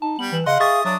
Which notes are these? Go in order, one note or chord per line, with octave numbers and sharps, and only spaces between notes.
D#4 A5
G3 B3 F#7
E3
C#3 D#5 F5 F#5 C6
G#4 E5 C#6 D#6 A6
F#3 D4 D#6